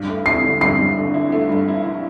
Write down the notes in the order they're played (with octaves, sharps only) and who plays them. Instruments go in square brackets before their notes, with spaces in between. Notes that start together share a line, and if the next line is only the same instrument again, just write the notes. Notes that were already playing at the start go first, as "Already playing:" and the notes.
Already playing: [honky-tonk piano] G2
A3
[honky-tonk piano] E4 [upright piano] C7
[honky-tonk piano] D3
[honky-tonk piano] G2 [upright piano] C7
[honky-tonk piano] G2
D3
E4
A3
G2
E4
E4